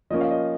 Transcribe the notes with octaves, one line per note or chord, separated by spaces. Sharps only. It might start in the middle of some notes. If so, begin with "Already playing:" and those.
F3 A#3 C#4 D#5
F5
D#5